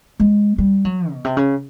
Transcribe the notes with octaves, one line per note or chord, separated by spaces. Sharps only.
G#3
G3
F#3
B2
C3
C#3